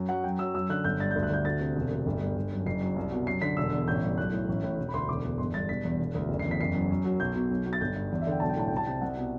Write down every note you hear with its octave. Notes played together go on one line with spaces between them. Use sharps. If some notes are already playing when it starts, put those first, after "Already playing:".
Already playing: F#2
F#3 F#5
F#2 G5
F#3 E6
F#2 E6
D3 F#6
G1 G6
G2 A6
D2 G6
F#6
D3 G6
D2 A6
C3
E1
D2
G1
G2
G1
F#2
F#1 C7
F#2
C2
B2
F#2 C7
D3 B6
E1 E6
E2
A1 G6
G2
B1 F#6
A2
A1
A2
E1
B5
D2 C6
E1 D6
E2
G1 C6
G2 A6
E1 B6
E2
E1
D2
F#1
C7
E2
B6
F#1 C7
F#2
F#2
F#3
B1 G6
B2
B1
B2
A6
G1 G6
G2
E2 D5
E5
D3 G5
B1 A5
G5
A2 A5
G5
C2 A5
C3 G5
C2 F#5
B2